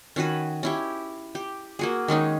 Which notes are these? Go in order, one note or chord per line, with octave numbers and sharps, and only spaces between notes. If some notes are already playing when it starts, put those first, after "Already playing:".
D#3 C#4 F#4 B4
C#4 E4 G4
G4
A#3 F#4 G#4
D#3 G#3 C#4 D#4